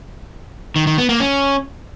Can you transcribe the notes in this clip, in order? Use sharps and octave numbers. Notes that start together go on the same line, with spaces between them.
D#3
D#3
B3
A#3
C#4